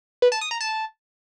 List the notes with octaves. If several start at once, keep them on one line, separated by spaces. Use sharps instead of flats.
B4
A5
D#6
A#5
A5